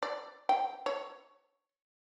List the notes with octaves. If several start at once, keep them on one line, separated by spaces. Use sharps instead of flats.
D5
G5
C#5